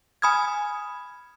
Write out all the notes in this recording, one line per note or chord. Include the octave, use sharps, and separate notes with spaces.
G#5 B5 D#6 F6 G#6